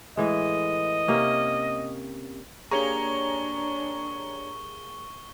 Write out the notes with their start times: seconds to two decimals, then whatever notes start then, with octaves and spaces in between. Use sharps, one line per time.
0.17 A2 E3 G#3 D#5
1.08 C3 A#3 C#4
2.71 A#3 D4 G4 G#4 C#5 A#5 C#6 G7